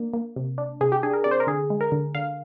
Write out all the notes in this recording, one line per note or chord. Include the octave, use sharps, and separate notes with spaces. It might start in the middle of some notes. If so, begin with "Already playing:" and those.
Already playing: A#3 D4
A#3
C3
D4
C3 G#4
G4
D4 G#4
A#4
C3 D5
C5
A#4
D3 G#4
G#3
A#4
D3
D3 F5